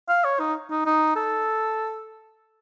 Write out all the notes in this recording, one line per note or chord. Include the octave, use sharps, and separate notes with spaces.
F5
C#5
D#4
D#4
D#4
A4